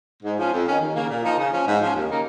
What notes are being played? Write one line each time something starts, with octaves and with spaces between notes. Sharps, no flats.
G#2
F3 C#4
F2
D#3 C#4
D#2
C#3 A#3
A#2
F3 A#3 D#4
C#3
F3 C#4
G#2
F3 C#4
D#2
C#3 A#3 D#4